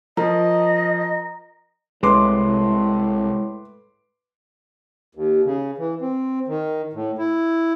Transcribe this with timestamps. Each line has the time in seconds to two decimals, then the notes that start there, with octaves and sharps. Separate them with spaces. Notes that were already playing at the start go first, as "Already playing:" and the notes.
0.17 F3 A#4 D#5
2.03 C2 A2 G#3 B4 C6 D6
5.15 D#2
5.44 C#3
5.78 E3
6.01 C4
6.48 D#3
6.93 A2
7.18 E4